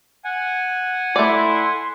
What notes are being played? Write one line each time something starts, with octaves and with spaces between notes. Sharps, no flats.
F#5 G#5
A3 E4 D5 C6